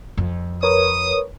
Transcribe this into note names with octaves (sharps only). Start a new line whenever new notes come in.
F2
A#4 B4 C#5 D#6